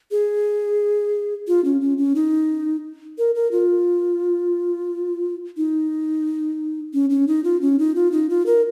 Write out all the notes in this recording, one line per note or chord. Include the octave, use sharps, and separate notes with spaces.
G#4
F4
C#4
C#4
C#4
D#4
A#4
A#4
F4
D#4
C#4
C#4
D#4
F4
C#4
D#4
F4
D#4
F4
A#4